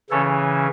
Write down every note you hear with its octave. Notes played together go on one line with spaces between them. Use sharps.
C#3 E3 C#4 A4 C#5